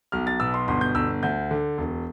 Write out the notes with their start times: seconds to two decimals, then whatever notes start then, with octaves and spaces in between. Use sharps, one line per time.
0.12 B1 F6
0.27 A6
0.40 B2 E6
0.54 C6
0.68 G1 C6
0.81 G6
0.95 G1 E6
1.23 D2 G6
1.51 D3
1.78 E1